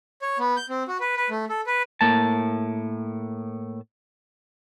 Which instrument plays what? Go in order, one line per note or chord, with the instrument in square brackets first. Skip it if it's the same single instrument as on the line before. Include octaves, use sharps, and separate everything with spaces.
[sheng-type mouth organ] C#5
B3
G6
C4
F#4
B4
B4
A3
A4
B4
[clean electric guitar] A2 A#3 A5